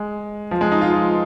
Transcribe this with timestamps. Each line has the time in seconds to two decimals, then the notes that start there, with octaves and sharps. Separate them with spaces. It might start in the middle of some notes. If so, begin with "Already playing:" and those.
Already playing: G#3
0.51 F3
0.61 G#3
0.72 D#4
0.81 F4
0.92 F4